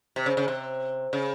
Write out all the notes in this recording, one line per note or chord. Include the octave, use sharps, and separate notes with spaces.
C3
C#3
C#3
C3
C#3